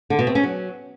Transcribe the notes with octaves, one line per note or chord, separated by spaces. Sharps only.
D3
B2
C4
C#4
F#3